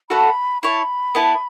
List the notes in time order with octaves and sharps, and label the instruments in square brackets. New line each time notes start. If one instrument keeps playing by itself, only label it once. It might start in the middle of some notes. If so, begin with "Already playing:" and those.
[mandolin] A3 F#4 A4 F#5 [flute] B5
[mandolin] E4 C#5 A5 [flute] B5
[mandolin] B3 E4 B4 A5